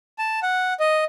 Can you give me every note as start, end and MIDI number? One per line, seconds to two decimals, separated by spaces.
0.19 0.40 81
0.43 0.73 78
0.80 1.04 75